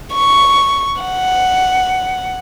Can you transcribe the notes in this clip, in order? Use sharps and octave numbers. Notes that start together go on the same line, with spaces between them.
C#6
F#5